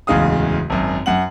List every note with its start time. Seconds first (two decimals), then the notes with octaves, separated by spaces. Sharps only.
0.07 D1 E2 C#3 G#3 F5 D#6
0.70 G#1 F#2
1.06 F#2 F#5 F#7